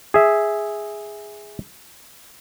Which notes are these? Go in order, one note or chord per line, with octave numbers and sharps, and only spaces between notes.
G#4 E5